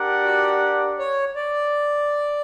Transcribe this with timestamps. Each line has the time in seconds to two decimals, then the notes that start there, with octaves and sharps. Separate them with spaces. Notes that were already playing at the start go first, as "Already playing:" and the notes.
Already playing: D4 G4 A#4 D5 F#5
0.24 F#4
0.99 C#5
1.36 D5